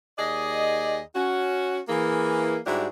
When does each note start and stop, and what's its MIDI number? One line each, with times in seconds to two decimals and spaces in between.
0.19 1.00 39
0.19 1.00 68
0.19 1.00 74
0.19 1.00 75
1.15 1.80 61
1.15 1.80 66
1.89 2.57 52
1.89 2.57 58
1.89 2.57 68
2.66 2.88 44
2.66 2.88 55
2.66 2.88 62
2.66 2.88 64
2.66 2.88 66
2.66 2.88 67